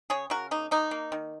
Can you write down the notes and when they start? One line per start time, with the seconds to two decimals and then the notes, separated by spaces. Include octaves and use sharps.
0.10 C#3 G#4 C#5
0.30 C#3 F#4 A#4
0.51 A#3 D#4
0.71 A#3 D#4
0.91 A#3
1.12 D#3